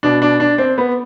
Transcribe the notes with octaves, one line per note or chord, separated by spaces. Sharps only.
B2 D4
D4
D4
C4
B3